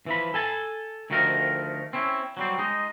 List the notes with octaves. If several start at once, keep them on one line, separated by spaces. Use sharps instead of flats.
E3 F3 B5
A4 G#5 A5
D2 D#3 F3 A3 A#4
C4 C#4 E4
F#3 G3 C4
G#3 D#4